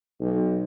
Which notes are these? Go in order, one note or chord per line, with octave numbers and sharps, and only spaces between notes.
B1